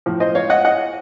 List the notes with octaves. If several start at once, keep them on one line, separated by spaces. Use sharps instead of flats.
A2 F3
C5 D#5
C#5 F5
D#5 F#5
D#5 F#5